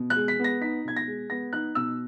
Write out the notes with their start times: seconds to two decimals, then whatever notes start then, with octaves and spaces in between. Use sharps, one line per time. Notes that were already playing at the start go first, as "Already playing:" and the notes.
Already playing: B2
0.10 F#6
0.16 G#3
0.28 B6
0.39 B3 A#6
0.61 D#4 B6
0.84 B2 G#6
0.96 A#6
1.08 G#3
1.30 B3 A#6
1.53 D#4 F#6
1.75 B2 E6